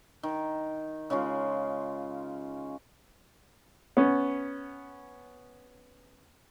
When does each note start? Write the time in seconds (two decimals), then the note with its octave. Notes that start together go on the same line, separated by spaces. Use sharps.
0.23 D#3
1.10 C#3 G#3 C#4 F4
3.97 B3 C#4